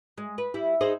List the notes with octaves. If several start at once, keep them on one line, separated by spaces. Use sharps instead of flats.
G#3
B4
G3 E4
D#4 G#4 C5